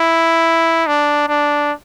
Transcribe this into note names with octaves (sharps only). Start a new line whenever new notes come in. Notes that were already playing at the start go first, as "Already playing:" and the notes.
Already playing: E4
D4
D4